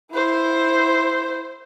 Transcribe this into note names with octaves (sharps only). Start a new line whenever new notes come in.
E4 C5